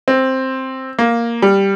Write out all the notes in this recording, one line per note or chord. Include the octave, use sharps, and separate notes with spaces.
C4
A#3
G3